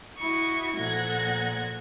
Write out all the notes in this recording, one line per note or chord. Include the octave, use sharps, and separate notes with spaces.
E4 F#4 D#5 C#6
A#2 F3 A4 F#5 G#6 A#6